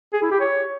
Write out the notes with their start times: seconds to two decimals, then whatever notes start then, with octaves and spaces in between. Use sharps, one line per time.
0.13 G#4
0.22 E4
0.31 G4
0.41 C#5